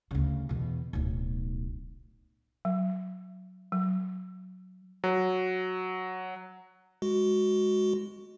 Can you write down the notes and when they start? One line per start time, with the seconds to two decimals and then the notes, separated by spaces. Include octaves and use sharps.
0.11 D2 C#3
0.49 E2 B2
0.93 D1 B1
2.65 F#3
3.72 F#3
5.04 F#3
7.02 G#3 F#4